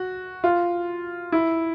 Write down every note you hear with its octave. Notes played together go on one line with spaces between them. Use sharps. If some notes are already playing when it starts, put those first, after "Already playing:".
Already playing: F#4
F4
E4